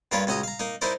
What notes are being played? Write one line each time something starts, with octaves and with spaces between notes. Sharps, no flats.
G2 A#3 F4 A#4 B4 C#5
C#2 C#4 F#4 D#5 A#5 D#6
F5 A#5
A#3 D#4
D#4 E4 A#4 C5 D5